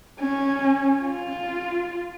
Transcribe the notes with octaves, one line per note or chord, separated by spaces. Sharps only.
C#4
F4